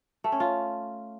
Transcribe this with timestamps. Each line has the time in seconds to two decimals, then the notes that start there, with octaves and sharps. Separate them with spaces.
0.24 A3
0.32 C#4
0.40 F4